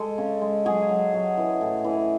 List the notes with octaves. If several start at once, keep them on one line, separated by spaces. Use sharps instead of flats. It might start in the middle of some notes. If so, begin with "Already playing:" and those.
Already playing: G#3 A4
C#3
G#3
F#3 G#4
F#3
F#3
E3
A2
E3